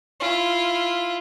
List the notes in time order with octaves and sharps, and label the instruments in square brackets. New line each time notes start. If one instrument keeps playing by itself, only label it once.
[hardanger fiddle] E4 F4